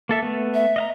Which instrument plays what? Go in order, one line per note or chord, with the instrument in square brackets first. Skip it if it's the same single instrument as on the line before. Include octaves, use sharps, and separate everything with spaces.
[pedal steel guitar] A#3 A4 E5
A3 B3
[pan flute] E5
[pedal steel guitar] D#5 F5 A#5